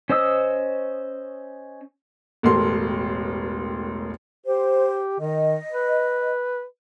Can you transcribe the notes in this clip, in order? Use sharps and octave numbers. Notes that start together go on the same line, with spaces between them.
C#4 C5 D#5 D#6 E6
E1 A1 A4 A#4 C6
G4 C5
D#3 D#5
B4